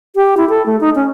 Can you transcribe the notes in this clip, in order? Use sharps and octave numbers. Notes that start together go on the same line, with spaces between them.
G4
E4
A4
A3
D#4
C#4